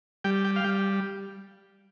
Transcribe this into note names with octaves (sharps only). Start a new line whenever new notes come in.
G3 G5
G5
F5
G3 G5